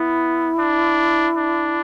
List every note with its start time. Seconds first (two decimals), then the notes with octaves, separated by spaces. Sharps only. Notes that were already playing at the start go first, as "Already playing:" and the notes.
Already playing: B3 E4
0.59 D4
1.37 D4